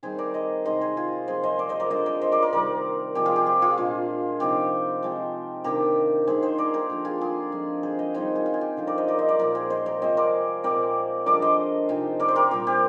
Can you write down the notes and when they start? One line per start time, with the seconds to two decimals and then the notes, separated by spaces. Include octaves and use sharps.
0.03 D#3 G3 C4 D#4 G#4 C5
0.18 A#4 D5
0.34 C5 D#5
0.65 C3 D#3 G#3 C5 D#5
0.81 G#4 C5
0.97 F4 G#4
1.28 C3 F3 A#3 D#4 G#4 C5
1.43 C5 D#5
1.59 A#4 D5
1.69 C5 D#5
1.80 A#4 D5
1.90 D3 G#3 D4 C5 D#5
2.06 A#4 D5
2.21 C5 D#5
2.32 A#4 D5
2.42 A#4 D5
2.53 C3 D#3 G3 A#4 D5
3.15 C3 F3 G#3 G4
3.25 F4 G#4
3.36 G4
3.46 G4
3.62 F4 G#4
3.77 A#2 G#3 D4
4.40 C3 F3 C4 D#4 G4
5.03 F3 G#3 C4
5.64 C3 D#3 A#3 D4 G4 A#4
6.27 D#3 A#3 D#4 G#4 C5
6.42 G#4 C5
6.58 A#4 D5
6.74 G4 A#4
6.90 D3 F3 A#3 D4
7.05 F4 G#4
7.21 F4 G#4
7.52 D3 F3 G#3
7.83 G#4 C5
7.99 C5 D#5
8.14 D#3 G3 C4 D#4 G#4 C5
8.35 F4 G#4
8.46 F4
8.54 G#4
8.61 G4
8.77 D3 F3 C4 D#4
8.87 A#4 D5
8.98 C5 D#5
9.08 A#4 D5
9.18 C5 D#5
9.29 A#4 D5
9.39 A#2 F3 A#3 D#4 A#4 D5
9.55 G#4 C5
9.70 C5 D#5
9.86 A#4 D5
10.02 C3 F3 G#3 C4 C5 D#5
10.17 A#4 D5
10.64 A#2 G#3 C4 A#4 D5
11.26 D3 F3 G#3 D4 A#4 D5
11.42 C5 D#5
11.89 C3 F3 C4 D#4
12.20 A#4 D5
12.28 C5
12.36 G4 A#4
12.51 A#2 G3 C4 G4
12.67 G4